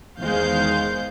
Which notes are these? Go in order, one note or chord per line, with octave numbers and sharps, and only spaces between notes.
E2 D#3 G#3 C5 F5 G6